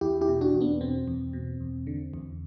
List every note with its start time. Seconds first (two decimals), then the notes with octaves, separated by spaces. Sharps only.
0.01 E2 E4 G4
0.21 E4 G4
0.28 B2
0.41 D4 F#4
0.54 E2
0.61 B3 D4
0.81 B2 C4
1.08 E2
1.33 B2
1.60 E2
1.87 D3
2.14 E2